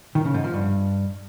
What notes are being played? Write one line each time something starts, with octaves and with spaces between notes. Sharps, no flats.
D#3
C#3
G#2
F3
G2